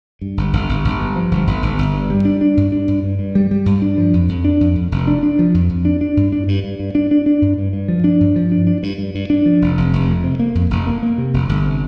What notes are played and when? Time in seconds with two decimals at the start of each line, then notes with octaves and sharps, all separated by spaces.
0.21 G2
0.37 G1
0.53 G1
0.69 G1
0.84 G1
1.00 G2
1.16 F3
1.31 G1
1.47 G1
1.62 G1
1.78 G1
1.94 G2
2.10 G3
2.25 D4
2.41 D4
2.57 G2
2.72 D4
2.88 G2
3.04 G2
3.19 G2
3.35 G3
3.51 G3
3.66 G2
3.82 D4
3.98 F3
4.13 F2
4.29 F2
4.45 D4
4.60 F2
4.76 F2
4.92 F1
5.07 D4
5.23 D4
5.39 F3
5.54 F2
5.70 F2
5.85 D4
6.01 D4
6.17 G2
6.32 D4
6.48 G2
6.64 G2
6.79 G2
6.95 D4
7.11 D4
7.26 D4
7.42 G2
7.58 G2
7.73 G2
7.88 F3
8.04 D4
8.20 G2
8.36 F3
8.52 D4
8.67 D4
8.83 G2
8.98 G2
9.15 G2
9.30 D4
9.46 F3
9.62 F1
9.77 F1
9.93 F1
10.08 F2
10.24 C3
10.40 A#3
10.55 F2
10.70 F1
10.87 A#3
11.03 A#3
11.18 C3
11.34 F1
11.49 G1
11.65 C3